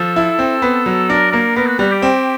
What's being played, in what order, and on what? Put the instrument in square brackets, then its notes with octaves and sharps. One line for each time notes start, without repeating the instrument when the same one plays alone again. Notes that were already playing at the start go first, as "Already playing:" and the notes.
Already playing: [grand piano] F3 [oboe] A4
[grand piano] E4
C4
B3
F#3
[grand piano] D4 [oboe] A#4
[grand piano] A#3 [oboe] A#4
[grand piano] B3 [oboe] A#4
[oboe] F#4
[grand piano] G3 [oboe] F#4
[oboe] G4
[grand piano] C4